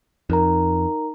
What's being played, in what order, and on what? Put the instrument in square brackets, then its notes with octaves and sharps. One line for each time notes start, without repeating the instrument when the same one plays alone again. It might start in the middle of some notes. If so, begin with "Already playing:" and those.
[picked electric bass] F2 [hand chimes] D#4 A#4 A#5